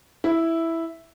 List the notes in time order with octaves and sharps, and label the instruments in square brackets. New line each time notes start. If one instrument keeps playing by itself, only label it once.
[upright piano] E4